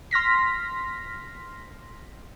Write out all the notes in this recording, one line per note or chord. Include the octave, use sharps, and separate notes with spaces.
C6 F6 A#6 B6